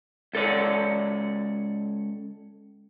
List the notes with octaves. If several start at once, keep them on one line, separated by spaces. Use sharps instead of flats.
C#2 A4 C#5 D5